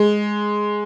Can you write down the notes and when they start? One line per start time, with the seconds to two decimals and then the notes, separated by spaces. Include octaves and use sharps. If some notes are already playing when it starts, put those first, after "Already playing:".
Already playing: G#3